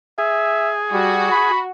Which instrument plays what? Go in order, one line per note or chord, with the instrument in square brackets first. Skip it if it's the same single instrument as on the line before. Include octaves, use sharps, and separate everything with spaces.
[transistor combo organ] G#4 [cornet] E5
[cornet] G3 [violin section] F#4
[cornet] B5